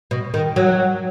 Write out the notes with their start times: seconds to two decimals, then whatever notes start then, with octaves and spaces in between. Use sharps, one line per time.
0.11 B2
0.34 D#3
0.56 F#3